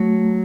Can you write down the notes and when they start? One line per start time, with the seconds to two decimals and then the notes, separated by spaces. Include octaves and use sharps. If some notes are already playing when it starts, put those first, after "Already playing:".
Already playing: F#3 A3